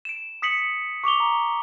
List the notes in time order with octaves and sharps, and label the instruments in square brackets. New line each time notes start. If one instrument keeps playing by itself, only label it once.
[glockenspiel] D7 E7
D#6 B6 C#7 F#7
C#6 D6 F7 G7
A#5